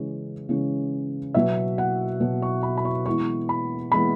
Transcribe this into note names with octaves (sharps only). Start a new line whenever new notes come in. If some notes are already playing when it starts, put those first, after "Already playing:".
Already playing: C#3 E3 G#3 C#4
C#3 E3 G#3 C#4
B2 F#3 B3 E5
F#5
B2 F#3 B3
C#6
B5
B5
C#6
E3 G#3 B3 E4 C#6
B5
E3 G#3 B3 E4 B5